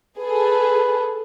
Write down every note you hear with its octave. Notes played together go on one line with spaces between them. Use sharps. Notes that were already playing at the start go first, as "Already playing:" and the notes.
G#4 A4 B4